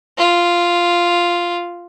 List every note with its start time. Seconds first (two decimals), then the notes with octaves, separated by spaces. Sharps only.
0.18 F4